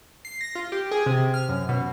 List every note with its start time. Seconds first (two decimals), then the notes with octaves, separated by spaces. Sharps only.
0.25 C7
0.41 A#6
0.55 F4
0.72 G4
0.91 G#4
1.06 C3
1.34 F6
1.49 F#2
1.69 B2